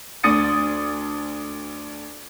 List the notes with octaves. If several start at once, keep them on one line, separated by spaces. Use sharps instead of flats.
D2 D4 D#6 A6 C#7 D#7